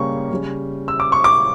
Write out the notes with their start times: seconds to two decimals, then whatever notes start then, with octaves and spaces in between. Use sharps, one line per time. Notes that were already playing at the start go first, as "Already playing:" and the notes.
Already playing: C#3 G3 A#3 C#4 C#6
0.31 C#3 G3 C#4
0.88 E6
1.00 D6
1.12 C#6
1.24 D6